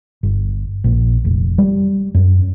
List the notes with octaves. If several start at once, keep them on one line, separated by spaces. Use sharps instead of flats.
G1
A#1
F1
G3
F#2